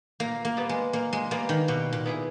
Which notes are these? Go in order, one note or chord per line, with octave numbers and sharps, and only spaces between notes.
A#2 A#3
A#3
G3 B3
G#3
A#2 A#3
G#3
G3 A#3 B3
D#3
B2 G3
A#2
B3 E4 G#4